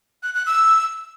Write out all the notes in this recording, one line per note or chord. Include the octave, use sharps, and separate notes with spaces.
F#6
F#6
E6